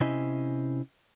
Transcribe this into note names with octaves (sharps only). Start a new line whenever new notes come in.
C3 C#4 E4 C5 D#5 G#5